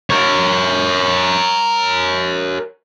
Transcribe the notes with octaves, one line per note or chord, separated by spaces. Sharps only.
A#4 C#5